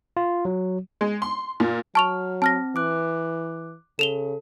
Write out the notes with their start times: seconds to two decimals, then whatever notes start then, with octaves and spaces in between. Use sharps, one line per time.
0.17 F4
0.45 F#3
1.01 G#3
1.22 C6
1.60 A#2
1.95 F#3 A5 C#6 F6 F7
2.42 C4 A5 F6 A#6
2.76 E3 D6 F#6
3.99 C#3 A4 E7 F7 G7